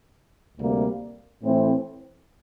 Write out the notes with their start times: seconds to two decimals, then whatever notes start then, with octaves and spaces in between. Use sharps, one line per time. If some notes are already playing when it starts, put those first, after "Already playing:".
0.57 D2 C3 G3 A#3
1.42 A2 E3 A3 C4